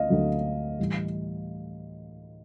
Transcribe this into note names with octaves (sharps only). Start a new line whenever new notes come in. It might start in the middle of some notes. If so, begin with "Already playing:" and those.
Already playing: D2 D#5 F5
D2 D3 F#3
A2 E3 G3